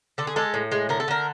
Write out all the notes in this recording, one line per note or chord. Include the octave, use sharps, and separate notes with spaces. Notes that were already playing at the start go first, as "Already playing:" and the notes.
D3 A4
G#4
G#3 A4
A2
G#3
D3 A#4
A4
D3 A#4